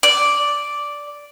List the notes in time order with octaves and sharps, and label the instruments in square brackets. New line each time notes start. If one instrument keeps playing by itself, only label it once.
[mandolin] D5